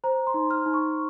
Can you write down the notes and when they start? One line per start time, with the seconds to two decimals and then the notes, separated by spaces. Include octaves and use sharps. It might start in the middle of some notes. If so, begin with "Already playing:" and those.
0.04 C5 A#5
0.27 C6
0.34 D#4
0.51 F6
0.66 D#4
0.74 C#6